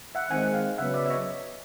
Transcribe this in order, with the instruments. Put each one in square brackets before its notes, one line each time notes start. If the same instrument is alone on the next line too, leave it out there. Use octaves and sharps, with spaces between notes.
[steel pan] E5 F#5
[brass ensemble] D#3 G#3 C4 [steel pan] F#5 G#5
[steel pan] F5 G5
[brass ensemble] C#3 F#3 B3 [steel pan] E5 F#5
[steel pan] D5 E5
E5
C#5 D#5